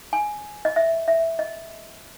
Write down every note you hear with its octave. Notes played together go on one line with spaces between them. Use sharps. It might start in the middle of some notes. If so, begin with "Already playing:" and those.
G#5
D#5
E5
E5
D#5